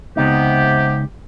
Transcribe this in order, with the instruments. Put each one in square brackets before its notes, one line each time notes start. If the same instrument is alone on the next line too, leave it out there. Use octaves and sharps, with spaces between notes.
[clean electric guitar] C#2 D#4 [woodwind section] C3 B3 G4